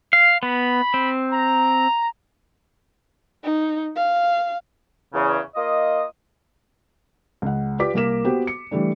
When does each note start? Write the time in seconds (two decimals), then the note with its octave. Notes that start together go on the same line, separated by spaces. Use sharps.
0.13 F5
0.43 B3 B5
0.94 C4
1.32 A#5
3.43 D#4
3.96 F5
5.14 E2 C#3
5.56 A#3 F4 D#5
7.42 C#2 F#5
7.79 F4 G4 B4 D5 D6 B6
7.94 C2 A#3 A#4 E7
8.24 B3 F#4 G4 C5
8.47 C#7
8.71 E3 G3 A3 D4